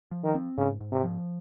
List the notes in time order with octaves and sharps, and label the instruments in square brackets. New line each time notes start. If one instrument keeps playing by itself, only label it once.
[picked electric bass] F3
[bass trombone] D#3
[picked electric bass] C4
[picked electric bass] G#2 [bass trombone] C#3
[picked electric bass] G#2
[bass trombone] C3
[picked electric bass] F3